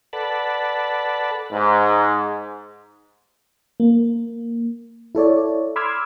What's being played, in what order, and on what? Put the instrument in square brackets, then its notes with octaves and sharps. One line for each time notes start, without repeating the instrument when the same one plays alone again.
[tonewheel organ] A4 B4 D5 F#5 A5 B5
[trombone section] G#2
[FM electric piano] A#3
E4 A4 C#5 D5
B5 C6 D6 E6 F6 G#6